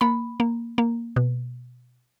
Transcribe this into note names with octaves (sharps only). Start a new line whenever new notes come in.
A#3 B5
A#3
A#3
B2